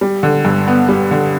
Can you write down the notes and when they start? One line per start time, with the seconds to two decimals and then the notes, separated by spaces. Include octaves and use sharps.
0.01 G3
0.23 D3
0.45 G2
0.68 B3
0.89 G3
1.11 D3